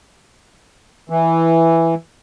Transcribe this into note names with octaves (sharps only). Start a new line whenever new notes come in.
E3